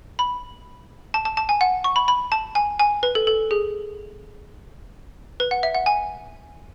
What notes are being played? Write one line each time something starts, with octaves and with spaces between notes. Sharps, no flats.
B5
A5
A5
A5
G#5
F#5
C#6
B5
B5
A5
G#5
G#5
B4
A4
A4
G#4
B4
F#5
E5
F#5
G#5